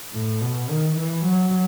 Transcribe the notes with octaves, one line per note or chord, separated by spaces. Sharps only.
A2
B2
D#3
E3
F#3